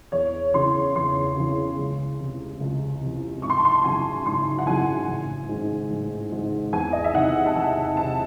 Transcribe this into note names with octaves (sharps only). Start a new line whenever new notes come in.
E2 C#5
C#3 E3 C6
E2 C6
C#3 E3
C#2
C3 E3
C#2
C3 E3
G#1 C#6
C6
A5
C6
F#2 C#3 E3 G#5
G#1 C6
F#5
F#2 C#3 E3 G#5
A1
G#2 D#3
A1
G#2 D#3
E2 G#5
D#5
E5
C3 D#3 F#5
A5
E2 G#5
C3 D#3 A5